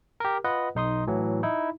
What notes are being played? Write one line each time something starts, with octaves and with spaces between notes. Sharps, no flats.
G4 A#4
F4 B4 D#5 F#5
B1 D#4 C6 D#6
A2 E3 F#3
D#4 E4